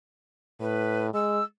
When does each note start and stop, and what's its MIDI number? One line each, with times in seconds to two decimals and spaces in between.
0.60 1.09 45
0.60 1.06 71
1.14 1.40 56
1.14 1.43 88